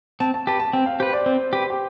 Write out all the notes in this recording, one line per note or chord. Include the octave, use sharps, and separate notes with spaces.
C4 A5
A5
G4 B4 A5
A5
C4 G5
F5
G4 B4 C5
D5
C4 C5
G4 B4
G4